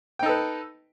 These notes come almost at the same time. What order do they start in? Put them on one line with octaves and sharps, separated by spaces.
G5 D#4 A4 B4